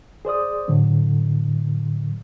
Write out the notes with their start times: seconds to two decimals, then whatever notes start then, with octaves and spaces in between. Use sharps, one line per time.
0.25 G#4 C5 D5 D#6
0.68 A2 D3 F#3